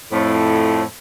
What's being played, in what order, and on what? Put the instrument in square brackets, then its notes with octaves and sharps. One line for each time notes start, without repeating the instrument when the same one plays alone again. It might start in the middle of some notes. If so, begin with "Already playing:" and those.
[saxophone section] F2 A2